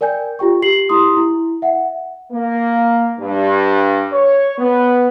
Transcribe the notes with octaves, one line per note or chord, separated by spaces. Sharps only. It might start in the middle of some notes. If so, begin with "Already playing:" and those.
A#4 D5 G5 G#5 G6
F4 G4 G5 C#6
G4 C7 F#7
E4 G4 C6 D#6
E4
E5 F#5
A#3
G2
C#5
B3